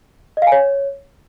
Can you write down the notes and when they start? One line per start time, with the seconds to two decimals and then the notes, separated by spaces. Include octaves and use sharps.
0.37 D#5
0.42 F5
0.47 G#5
0.52 C#5